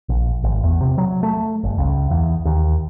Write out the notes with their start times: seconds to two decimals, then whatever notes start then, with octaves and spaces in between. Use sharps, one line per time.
0.09 A#1
0.44 G#1
0.64 E2
0.81 C3
0.98 F#3
1.23 A3
1.63 G1
1.78 C#2
2.10 E2
2.45 D#2